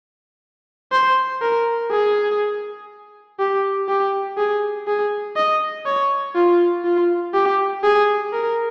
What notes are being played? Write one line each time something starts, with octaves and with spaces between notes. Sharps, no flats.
C5
A#4
G#4
G4
G4
G#4
G#4
D#5
C#5
F4
F4
G4
G#4
A#4